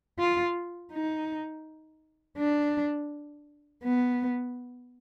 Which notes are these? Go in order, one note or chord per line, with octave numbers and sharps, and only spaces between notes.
F4
D#4
D4
B3